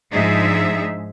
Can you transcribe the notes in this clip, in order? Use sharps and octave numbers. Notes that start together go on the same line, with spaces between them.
G#2 F3 D4 D#4 G#4 E5